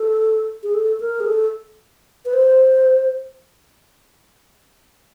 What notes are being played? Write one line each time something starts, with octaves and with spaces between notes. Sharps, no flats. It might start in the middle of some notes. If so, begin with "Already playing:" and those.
Already playing: A4
G#4
A4
A#4
G#4
A4
B4
C5